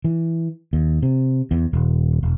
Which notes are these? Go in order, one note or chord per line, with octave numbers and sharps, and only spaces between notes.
E3
D#2
C3
E2
D#1
E1